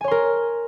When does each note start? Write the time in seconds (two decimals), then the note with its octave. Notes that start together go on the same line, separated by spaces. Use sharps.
0.01 G#5
0.04 C#5
0.08 C6
0.11 A#4